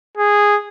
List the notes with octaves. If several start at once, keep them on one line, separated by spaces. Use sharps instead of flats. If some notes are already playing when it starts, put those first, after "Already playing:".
G#4